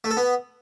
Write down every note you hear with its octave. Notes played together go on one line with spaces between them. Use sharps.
A3
A4
B3